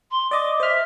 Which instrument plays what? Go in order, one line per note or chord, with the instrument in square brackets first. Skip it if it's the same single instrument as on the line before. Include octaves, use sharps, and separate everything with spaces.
[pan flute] C6
[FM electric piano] D5 D#5 [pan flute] D6
[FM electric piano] C5 F6 [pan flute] E5